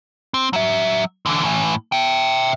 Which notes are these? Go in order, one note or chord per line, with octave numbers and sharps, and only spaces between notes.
C4
F#3 E5
D3 E3
A2 E3
E5 G5